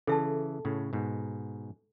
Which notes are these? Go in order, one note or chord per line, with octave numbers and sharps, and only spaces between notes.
C#3 E3 A4 E5 A5
A2 C#3
G#2 B2